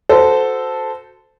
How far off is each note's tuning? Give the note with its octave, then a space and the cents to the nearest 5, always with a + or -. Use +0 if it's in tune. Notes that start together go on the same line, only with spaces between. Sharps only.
F#4 +0 A4 +0 C5 -20